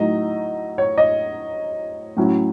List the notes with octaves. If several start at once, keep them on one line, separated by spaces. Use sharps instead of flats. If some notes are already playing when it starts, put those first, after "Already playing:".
Already playing: A2 F#3 A3 D#4 D#5
C#5
D#5
A2 F#3 C#4 E4